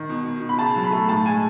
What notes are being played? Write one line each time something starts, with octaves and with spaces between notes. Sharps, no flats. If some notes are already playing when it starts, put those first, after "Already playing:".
Already playing: D#3
B2
B2
B2
B5
C#3 A5
F#3
B5
A3
A2 A5
G#3 G#5